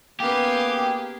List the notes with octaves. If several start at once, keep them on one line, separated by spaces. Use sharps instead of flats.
A#3 B3 C#4 G4 G#4 F5